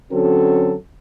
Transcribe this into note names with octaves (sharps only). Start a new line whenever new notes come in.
D3 F#3 C4 C#4 F#4 A4